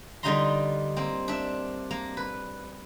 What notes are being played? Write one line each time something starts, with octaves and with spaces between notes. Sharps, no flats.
D3 G3 D#4 F4 A#5 C6
A#3 C4
D4 E5
A#3
B4